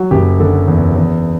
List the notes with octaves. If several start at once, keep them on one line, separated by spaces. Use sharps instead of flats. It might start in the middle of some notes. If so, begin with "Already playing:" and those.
Already playing: F#3 F#4
F#1 G4
D3 A4
E2
E2